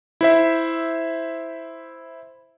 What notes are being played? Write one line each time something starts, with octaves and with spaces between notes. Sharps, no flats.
E4 C5 E5